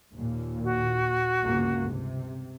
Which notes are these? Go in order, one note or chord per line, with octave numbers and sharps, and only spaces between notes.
D#2 A#2
F#4
G1 C#2 A#3
C3